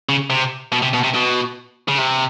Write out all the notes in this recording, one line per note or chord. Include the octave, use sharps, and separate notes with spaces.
C#3
C3
B2
C3
B2
C3
B2
C#3
C3